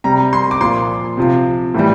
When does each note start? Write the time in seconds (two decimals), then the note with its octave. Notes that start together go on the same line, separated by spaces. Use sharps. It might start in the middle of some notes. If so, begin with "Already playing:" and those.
0.04 C3 G3 A#5
0.33 C6
0.51 D6
0.61 A#2 F3 C6
1.17 C3 F3
1.74 A2 E3 G3